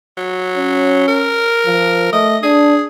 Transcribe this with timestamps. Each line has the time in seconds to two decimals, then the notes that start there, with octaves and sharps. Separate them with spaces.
0.17 F#3
0.57 C#4
1.08 A#4
1.66 F3
2.13 A3 D#5
2.43 D4 G#4